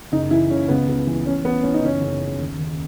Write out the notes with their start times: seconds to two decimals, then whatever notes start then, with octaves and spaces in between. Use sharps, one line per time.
0.12 F#1 D#4
0.31 E3 E4
0.50 C#3 C#4
0.68 C#2 B3
0.88 C#2
1.07 E3
1.25 A1 C#4
1.44 A1 B3
1.63 E3 C#4
1.74 D#4
1.82 F#1 C#4
2.01 F#1
2.21 C#3
2.39 D#2
2.58 D#2